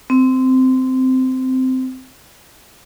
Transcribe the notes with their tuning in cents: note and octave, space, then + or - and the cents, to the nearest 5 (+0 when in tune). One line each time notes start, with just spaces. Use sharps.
C4 -15